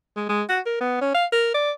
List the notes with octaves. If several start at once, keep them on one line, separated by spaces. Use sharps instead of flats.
G#3
G#3
F#4
A#4
B3
C#4
F5
A#4
D5